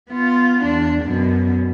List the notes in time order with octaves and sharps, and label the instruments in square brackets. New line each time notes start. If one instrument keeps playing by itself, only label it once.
[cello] B3 F4
E2 D4
F#2 B2